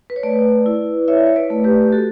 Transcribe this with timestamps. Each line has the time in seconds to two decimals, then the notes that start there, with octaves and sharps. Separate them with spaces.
0.10 B4
0.16 C#5
0.23 A3 B4 D5
0.66 E4
1.08 E4 C#5 E5
1.27 C#5
1.36 B4 D5
1.50 A3
1.64 G4 B4
1.82 G4
1.92 F#4 A4